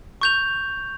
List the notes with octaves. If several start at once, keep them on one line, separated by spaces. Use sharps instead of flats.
C#6 G6 F7